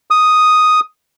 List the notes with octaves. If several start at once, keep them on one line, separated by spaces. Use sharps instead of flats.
D#6